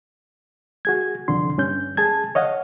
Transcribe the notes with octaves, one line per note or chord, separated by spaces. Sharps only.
F#4 G#4 G#6
C2 F2 D3 C6
G2 C#4 G6
G#4 A5 G#6
C#5 D#5 F5 F#5